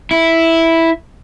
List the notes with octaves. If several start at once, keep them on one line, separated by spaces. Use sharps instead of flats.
E4